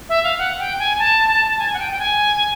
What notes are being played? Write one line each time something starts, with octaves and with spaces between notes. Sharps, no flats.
E5
F5
F#5
G5
G#5
A5
A5
G#5
F#5
G5
G5
G#5